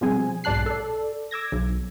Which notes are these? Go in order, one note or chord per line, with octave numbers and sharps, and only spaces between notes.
B2 F3 G3 C4 G#4 G#5
B1 G#2 D5 A5 F#6 C7
A4 D5
D6 E6 G#6 A#6
B1